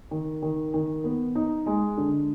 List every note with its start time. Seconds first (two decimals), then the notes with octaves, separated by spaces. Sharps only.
0.11 D#3
0.42 D#3
0.74 D#3
1.04 B3
1.35 D#4
1.66 G#3
1.97 D3